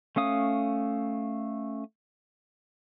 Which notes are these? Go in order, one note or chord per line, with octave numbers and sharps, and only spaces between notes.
A3 C#4 F5 D#6